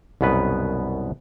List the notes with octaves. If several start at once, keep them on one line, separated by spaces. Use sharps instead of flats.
C2 F#2 B2 B3 B4